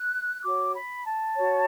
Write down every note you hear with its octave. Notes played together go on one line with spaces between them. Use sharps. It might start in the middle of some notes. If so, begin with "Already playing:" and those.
Already playing: F#6
F#4 C#5 D6
B5
A5
F#4 C#5